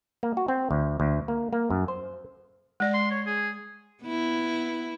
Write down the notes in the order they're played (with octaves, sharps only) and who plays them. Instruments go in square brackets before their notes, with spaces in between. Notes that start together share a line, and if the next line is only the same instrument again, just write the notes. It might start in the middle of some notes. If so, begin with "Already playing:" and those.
[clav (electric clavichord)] A#3
F#4
C4
D2
D2
A#3
A#3
F#2
C5
[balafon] G#3 D5
[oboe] C6
C#5
G#4
[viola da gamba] B3 E4